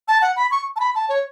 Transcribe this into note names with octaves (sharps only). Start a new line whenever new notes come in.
A5
F#5
B5
C#6
A5
B5
A5
C#5